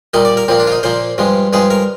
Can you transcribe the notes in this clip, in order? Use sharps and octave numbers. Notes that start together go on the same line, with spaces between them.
A#2 G3 A#3 D#5
D5
A#4
A#2 F3 A#3 C4
D4
F4
D#4
A#2 F3 A#3 C5
G2 F3 G#3
G2 F3 G#3 G#4
A#4